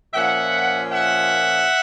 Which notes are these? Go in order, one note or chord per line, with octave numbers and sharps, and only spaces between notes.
A#2 F3 A#3 C#4 E5 F#5
E5 F#5